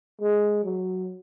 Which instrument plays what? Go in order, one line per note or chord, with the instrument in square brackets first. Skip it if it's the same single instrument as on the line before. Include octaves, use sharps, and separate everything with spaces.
[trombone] G#3
F#3